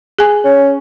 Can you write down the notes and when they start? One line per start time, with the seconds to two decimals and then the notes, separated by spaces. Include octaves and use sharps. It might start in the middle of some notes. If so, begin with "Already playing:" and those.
0.19 G#4 G#5
0.45 C#4